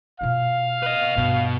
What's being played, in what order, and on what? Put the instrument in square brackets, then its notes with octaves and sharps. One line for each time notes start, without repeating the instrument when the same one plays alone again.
[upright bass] B2 F4 [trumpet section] F5
[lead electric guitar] B4 D#5
[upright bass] G2 [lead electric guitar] B2